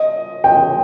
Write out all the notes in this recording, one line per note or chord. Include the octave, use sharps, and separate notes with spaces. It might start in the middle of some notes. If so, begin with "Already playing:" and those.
Already playing: D#5
G5